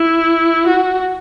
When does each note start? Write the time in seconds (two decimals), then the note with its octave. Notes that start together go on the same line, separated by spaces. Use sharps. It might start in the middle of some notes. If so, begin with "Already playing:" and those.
Already playing: E4
0.67 F#4